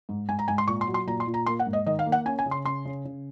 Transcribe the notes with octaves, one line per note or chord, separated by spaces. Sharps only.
G#2
G#2 G#5
A#5
G#2 G#5
C6
A#2 C#6
C6
F#3
C6
A#2 A#5
C6
A#2
A#5
A#3 C6
F#5
G#2
D#5
D#3 D#5
F5
A#3
F#5
C#4 G#5
G#5
C#3
C6
C#3 C6
C#3
C#3